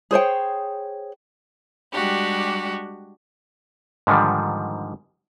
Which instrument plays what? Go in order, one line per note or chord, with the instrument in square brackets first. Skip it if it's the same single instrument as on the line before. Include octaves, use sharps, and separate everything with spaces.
[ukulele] G#4 C5 C#5 G5
[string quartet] G3 G#3 D4 F#4 G4
[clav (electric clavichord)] G#2 D3 D#3 F3 G3